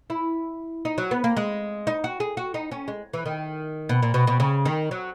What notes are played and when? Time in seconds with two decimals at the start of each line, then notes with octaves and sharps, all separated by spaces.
0.10 E4
0.85 D#4
0.98 F#3
1.11 B3
1.24 A#3
1.37 G#3
1.87 D#4
2.04 F#4
2.20 G#4
2.37 F#4
2.54 D#4
2.71 C#4
2.88 G#3
3.13 E3
3.26 D#3
3.89 B2
4.02 A#2
4.14 B2
4.27 B2
4.40 C#3
4.65 D#3
4.91 F#3